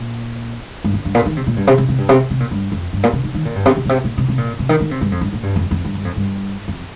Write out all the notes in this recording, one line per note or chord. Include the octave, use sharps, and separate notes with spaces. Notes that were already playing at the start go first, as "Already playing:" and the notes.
Already playing: A#2
G2
F2
G2
A#2
D#3
C3
A#2
G2
C3
C3
C3
G2
C3
C3
A#2
G2
F2
G2
A#2
C3
D#3
D#3
A#2
G2
C3
C3
A#2
C3
A#2
C3
C3
A#2
C3
D#3
D#3
C3
G2
F2
G2
A#2
G2
F2
F2
G2
G2
F2
G2
F2